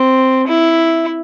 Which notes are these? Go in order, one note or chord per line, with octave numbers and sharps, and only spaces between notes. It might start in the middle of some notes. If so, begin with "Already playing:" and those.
Already playing: C4
E4